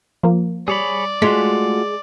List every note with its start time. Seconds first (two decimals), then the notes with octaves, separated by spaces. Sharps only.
0.23 F3 A#3
0.68 G3 G#4 C#5 D5 B5
1.22 G#3 A3 F4 F#4 B6